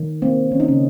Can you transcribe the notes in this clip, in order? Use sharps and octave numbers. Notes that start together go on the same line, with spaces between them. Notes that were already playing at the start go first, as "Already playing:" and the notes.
Already playing: D#3
A#3 C4
D#3 C#4
D#4
C#3 C#4